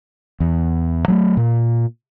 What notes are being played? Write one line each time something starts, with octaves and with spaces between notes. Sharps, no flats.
E2
F#3 G#3 A3
A#2